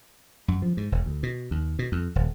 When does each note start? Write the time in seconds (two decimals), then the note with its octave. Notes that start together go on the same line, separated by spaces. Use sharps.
0.48 F#2
0.62 F3
0.77 G#2
0.92 E1
1.06 D2
1.23 B2
1.51 D#2
1.79 B2
1.92 F2
2.15 D#1